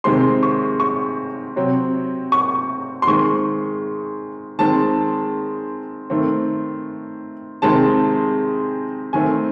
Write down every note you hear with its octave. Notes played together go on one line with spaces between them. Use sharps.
C3 D#3 G#3 C4 C6
C#6
C#6
C3 F#3 C4
C#6
C6
D#3 G#3 C4 C#6
D#3 G#3 C4 A5
D#3 A3 C4
C3 D#3 G#3 C4 A5
D#3 A3 C4 G#5